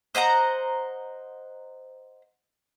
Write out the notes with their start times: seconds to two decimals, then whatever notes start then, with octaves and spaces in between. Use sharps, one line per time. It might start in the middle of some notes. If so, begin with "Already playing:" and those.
0.15 C5 D#5 F#5 A#5